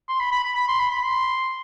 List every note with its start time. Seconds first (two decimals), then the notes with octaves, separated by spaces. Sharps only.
0.09 C6
0.20 B5
0.32 B5
0.44 B5
0.55 B5
0.68 C6
0.79 B5
0.91 B5
1.03 C6